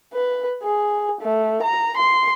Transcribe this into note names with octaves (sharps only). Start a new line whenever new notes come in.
B4
G#4
A3
A#5
C6